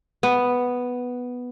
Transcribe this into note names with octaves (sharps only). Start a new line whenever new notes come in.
B3